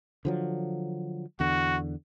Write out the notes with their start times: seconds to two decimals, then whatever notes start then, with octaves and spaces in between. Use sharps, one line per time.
0.25 D3 F3 F#3
1.40 E2 D3 F#4